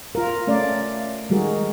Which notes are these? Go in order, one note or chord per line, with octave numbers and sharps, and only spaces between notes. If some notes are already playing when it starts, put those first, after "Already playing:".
F4 A#4
A3 C#4 D5 F5
D#3 G3 G#3 F#4 G#4 A#4